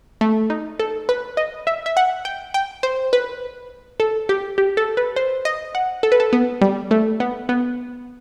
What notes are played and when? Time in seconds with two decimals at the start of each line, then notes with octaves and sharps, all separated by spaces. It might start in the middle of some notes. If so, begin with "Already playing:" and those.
0.21 A3
0.50 D#4
0.80 A4
1.09 B4
1.37 D#5
1.67 E5
1.86 E5
1.97 F#5
2.25 G5
2.54 G5
2.83 C5
3.13 B4
4.00 A4
4.29 G4
4.58 G4
4.77 A4
4.97 B4
5.16 C5
5.45 D#5
5.75 F#5
6.03 A4
6.12 B4
6.20 A4
6.33 B3
6.61 G3
6.91 A3
7.20 B3
7.49 B3